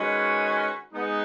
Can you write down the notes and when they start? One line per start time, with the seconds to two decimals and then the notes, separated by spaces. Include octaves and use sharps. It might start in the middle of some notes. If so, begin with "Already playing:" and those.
Already playing: D#3 G#3 C#4 F#4 B4
0.92 G#3 B3 D#4